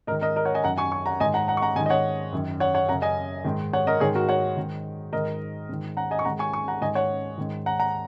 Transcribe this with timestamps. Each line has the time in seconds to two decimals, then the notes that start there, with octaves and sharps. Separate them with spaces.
0.07 G#2 A#4 D#5
0.12 D#3
0.21 A#4 D#5
0.36 A#4 D#5
0.45 C#5 F#5
0.55 D#5 G#5
0.64 F#2 D#3 F#5 A#5
0.78 G#5 C#6
0.92 G#5 C#6
1.06 F#5 A#5
1.20 G#2 D#5 G#5
1.25 D#3
1.34 F#5 A#5
1.48 F#5 A#5
1.57 C#6
1.62 F#5 A#5
1.76 G#2 D#5 G#5
1.80 D#3
1.86 D#5
1.90 C#5 F#5
2.33 F#2 D#3
2.60 C#5 F#5
2.75 C#5 F#5
2.89 F#2 F#5 A#5
2.92 C#3
3.02 D#5 G#5
3.44 G#2 D#3
3.73 C#5 F#5
3.87 A#4 D#5
4.00 G#2 D#3 G#4 C#5
4.15 F#4 A#4
4.29 C#5 F#5
4.57 G#2 D#3
5.13 G#2 D#3 A#4 D#5
5.69 G#2 D#3
5.97 F#5 A#5
6.11 D#5 G#5
6.19 C#6
6.25 G#2 D#3 F#5 A#5
6.39 G#5 C#6
6.53 G#5 C#6
6.68 F#5 A#5
6.81 G#2 D#3 D#5 G#5
6.95 C#5 F#5
7.38 G#2 D#3
7.66 F#5 A#5
7.79 F#5 A#5